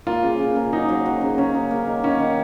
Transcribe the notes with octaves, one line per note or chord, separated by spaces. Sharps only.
A#3 F4
C#3
C#3
A#3
F#3 D#4
F#3
F#3
C#3
F#3 C#4
A#3
A#3
D#3
D#3 C#4
D#3